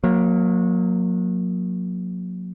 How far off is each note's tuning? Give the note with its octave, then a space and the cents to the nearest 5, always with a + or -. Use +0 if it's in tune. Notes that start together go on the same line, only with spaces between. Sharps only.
F#3 -30 A#3 +0